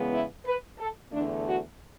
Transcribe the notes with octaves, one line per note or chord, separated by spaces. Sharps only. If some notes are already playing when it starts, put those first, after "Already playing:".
Already playing: E2 C#3 G#3 B3
E4
B4
A4
E2 D3 A3 D4
F#4